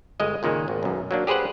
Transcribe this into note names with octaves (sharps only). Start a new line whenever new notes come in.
G1 G#3 D#5
C#2 A#2 D#3 G#3
G#1
B1 F#2
F#3 A#3 D4
G4 G#4 B4 C5 F#5